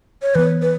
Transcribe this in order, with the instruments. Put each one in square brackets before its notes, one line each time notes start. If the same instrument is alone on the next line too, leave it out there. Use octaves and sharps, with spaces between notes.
[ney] C#5
[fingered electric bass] E3 B3 [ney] B4
[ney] B4